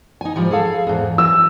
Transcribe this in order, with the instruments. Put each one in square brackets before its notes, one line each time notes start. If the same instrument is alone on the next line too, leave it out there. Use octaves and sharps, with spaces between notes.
[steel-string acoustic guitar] D#4 G#5
G#2 F3 G3
G#4 A4 F5
E2 G#2
[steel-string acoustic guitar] E3 F#3 [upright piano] E6